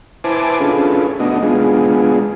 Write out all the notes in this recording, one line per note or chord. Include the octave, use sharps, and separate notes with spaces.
E4 B4 C5 G#5 A5 D6
C#4 D4 F4 G#4 A4 B4
A3 B3 D4 D#4 F#4 D#5
G#3 B3 D4 F4 G#4